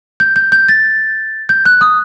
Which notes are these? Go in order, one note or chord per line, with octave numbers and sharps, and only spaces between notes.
G6
G6
G6
A6
G6
F#6
D#6